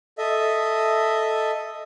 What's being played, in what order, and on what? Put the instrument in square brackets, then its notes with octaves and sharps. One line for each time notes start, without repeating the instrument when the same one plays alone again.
[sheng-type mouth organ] A4 D#5 E5